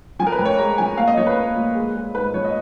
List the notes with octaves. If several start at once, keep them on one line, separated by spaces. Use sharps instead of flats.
F3 G#5
A#4
B4
F2
C#5
G#3 A#5
F3 G#5
A#3 F5
D#5
F3 C#5
B4
A#3
A#2
G#3
G#3
G#2 B4
F3 C#5
D#5